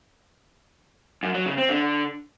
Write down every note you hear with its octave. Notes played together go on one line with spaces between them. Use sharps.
F#2
F#3
C#3
C4
D3